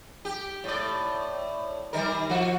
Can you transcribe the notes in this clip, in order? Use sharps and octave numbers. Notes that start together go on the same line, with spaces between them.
G4
A2 D5
D#3 G3 A#4
F3 F#4